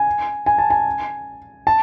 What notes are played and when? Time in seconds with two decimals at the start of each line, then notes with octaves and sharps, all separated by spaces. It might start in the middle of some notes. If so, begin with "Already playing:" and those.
Already playing: G#5
0.46 G#5
0.58 A5
0.70 G#5
1.67 A5